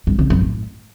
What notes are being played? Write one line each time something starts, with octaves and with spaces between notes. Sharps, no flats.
G2
C#3
F#2
A2